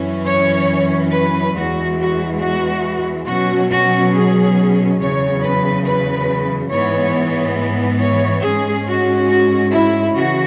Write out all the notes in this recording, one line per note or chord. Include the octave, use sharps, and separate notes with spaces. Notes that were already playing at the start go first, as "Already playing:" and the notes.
Already playing: F#2 E3 C#4
C#5
B4
E2 E3 G#3 F#4
F#4
F#4
B2 F#3 C#4 F#4
F#4
G#4
E2 C#3 F#3 C#5
B4
B4
G#2 E3 B3 C#5
C#5
G#2 G#3 C#4 G#4
F#4
F#4
E4
C#3 E3 F#4